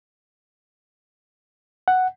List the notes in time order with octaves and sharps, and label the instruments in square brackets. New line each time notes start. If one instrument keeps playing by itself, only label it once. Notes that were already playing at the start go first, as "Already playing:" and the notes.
[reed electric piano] F#5